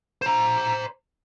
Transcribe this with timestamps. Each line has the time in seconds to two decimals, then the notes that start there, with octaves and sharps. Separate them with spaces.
0.22 C5 A#5